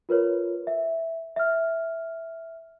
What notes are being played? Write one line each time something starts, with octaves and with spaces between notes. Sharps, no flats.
F4 A#4 B4 C#5
E5
E5 F6